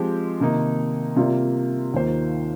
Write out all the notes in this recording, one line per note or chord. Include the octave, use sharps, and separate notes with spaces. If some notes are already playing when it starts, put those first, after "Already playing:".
Already playing: F3 G#3 C4 G4
C3 D#3 A#3 D#4
C3 G3 A#3 F4
D#2 D#3 A#3 F4 C5